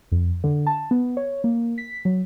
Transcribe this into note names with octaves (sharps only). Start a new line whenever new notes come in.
F2
D3
A5
B3
C#5
A#3
B6
F#3